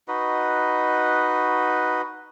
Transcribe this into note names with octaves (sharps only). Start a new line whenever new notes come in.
D#4 F#4 B4 D#5